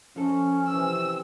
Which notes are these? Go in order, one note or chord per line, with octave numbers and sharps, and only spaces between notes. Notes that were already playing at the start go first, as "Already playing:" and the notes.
F3 C#4 A4
C3 E3 C4 E6